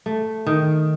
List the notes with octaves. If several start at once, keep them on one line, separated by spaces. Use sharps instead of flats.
A3
D#3